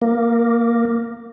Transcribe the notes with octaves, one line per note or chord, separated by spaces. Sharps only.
A#3